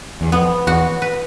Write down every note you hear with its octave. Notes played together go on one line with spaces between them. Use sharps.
E2
F2 B3
E2 F#4
B4